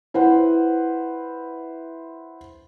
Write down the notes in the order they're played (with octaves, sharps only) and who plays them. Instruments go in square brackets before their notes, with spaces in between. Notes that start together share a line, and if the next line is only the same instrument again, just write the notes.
[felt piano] E4 B4 C5 F#5